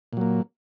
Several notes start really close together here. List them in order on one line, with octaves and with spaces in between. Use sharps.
A#2 F#3 A#3